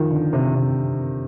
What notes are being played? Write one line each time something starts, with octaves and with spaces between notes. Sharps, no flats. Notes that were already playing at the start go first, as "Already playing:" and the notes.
Already playing: D#3 F3
D3
C3
C3